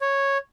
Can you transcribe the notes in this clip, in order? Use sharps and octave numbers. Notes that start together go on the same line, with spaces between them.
C#5